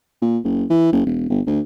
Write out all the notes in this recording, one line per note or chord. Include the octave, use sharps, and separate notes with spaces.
A#2
F#1
E3
F#1
E1
G1
D2